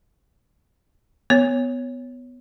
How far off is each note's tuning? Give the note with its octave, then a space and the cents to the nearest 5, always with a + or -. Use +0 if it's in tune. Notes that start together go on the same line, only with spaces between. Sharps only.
B3 +15 C#5 +0